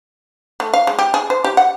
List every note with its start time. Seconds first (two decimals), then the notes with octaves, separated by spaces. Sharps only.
0.60 A3
0.74 F5
0.87 G#3
0.99 G4
1.14 G#4
1.30 C5
1.44 G4
1.57 F#5